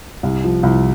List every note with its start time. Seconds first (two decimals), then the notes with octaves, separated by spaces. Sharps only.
0.23 C2
0.44 F3
0.63 C2